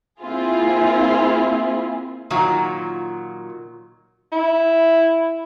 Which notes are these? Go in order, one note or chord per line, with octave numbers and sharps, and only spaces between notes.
A#3 C4 E4 F4 G#4
A#2 D#3 F#3 F4 F#4
E4